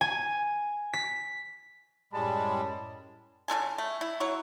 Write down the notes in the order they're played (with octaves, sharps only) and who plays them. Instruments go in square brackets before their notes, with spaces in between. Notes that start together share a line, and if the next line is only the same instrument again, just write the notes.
[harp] G#5
B6
[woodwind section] F#2 A2 [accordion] G3 G#3 [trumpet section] D5 A5 B5
[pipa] C#3 D#4 A4 G#5
A3
E4
F#3 E4 C#5